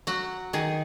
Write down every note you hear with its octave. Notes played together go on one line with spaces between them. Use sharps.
F#3 F#4
D#3 G#4